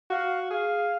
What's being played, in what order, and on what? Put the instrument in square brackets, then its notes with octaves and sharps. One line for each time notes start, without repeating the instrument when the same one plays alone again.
[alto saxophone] F#4 [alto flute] F5
[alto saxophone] G#4 [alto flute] F5